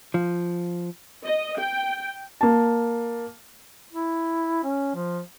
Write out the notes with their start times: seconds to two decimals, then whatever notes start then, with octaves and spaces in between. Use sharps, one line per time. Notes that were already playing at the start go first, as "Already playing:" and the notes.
0.14 F3
1.24 D#5
1.59 G5
2.41 A#3 A5
3.92 E4
4.63 C#4
4.95 F3